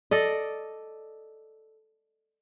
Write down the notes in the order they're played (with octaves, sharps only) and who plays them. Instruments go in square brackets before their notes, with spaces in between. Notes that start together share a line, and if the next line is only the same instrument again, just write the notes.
[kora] A4 D5 D#5